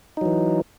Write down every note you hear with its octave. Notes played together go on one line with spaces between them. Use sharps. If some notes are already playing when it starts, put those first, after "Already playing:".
E3 F#3 D#4